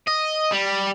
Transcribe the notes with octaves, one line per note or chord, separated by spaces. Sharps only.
D#5
G3